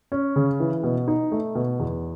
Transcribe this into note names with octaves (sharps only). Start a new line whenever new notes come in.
C#4
C#3
E3
B2
D#4
A3
B2
E2